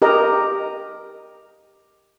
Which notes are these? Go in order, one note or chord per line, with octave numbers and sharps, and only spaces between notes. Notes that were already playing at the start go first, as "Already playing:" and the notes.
G4 A#4 D#5 A#5